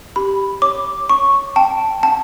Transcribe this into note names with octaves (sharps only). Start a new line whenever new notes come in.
G4 B5
C#5 D6
C#5 C#6
G5 A5
F#5 A5